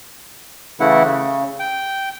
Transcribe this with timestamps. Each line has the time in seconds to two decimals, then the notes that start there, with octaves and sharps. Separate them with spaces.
0.80 C#3 E3 A3 E4 F#5
1.04 C#3
1.60 G5